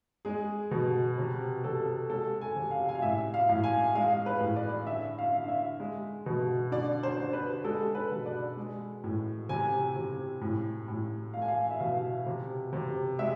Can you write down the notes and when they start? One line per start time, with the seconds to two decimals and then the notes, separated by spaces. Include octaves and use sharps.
0.25 G#3 G#4
0.71 B2
1.18 C3
1.64 C3 A4
2.10 G#3 A4
2.41 G#5
2.56 C3
2.71 F5
2.89 G#5
2.95 F5
3.02 A2 E5
3.34 F5
3.49 A2
3.64 G#5
3.95 G#3 F5
4.26 B4
4.40 A2
4.56 D5
4.87 D3 E5
5.19 F5
5.33 D3
5.44 F5
5.48 E5
5.80 G#3
6.26 B2
6.72 D3 D5
7.03 C5
7.18 D3
7.33 B4
7.64 G#3 A4
7.95 B4
8.11 B2
8.26 D5
8.57 G#3
9.04 A2
9.49 C3 G#5
9.96 C3
10.41 A2
10.88 A2
11.34 A3 F5
11.42 G#5
11.48 F5
11.71 E5
11.80 B2 F5
12.26 C3
12.73 C3
13.19 G#3 E5